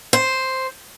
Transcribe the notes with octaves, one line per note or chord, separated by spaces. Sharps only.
C5